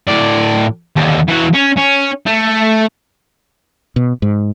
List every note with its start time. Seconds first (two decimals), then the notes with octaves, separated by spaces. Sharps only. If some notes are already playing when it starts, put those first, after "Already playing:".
0.08 A2 D5
0.96 D#2 D3
1.28 E3 F#4
1.55 C#4
1.77 C#4
2.26 A3
3.96 B2
4.22 G#2